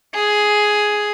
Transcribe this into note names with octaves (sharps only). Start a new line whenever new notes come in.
G#4